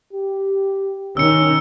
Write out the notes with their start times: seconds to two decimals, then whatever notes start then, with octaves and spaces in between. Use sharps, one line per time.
0.13 G4
1.17 D#3 C#4 E6 C#7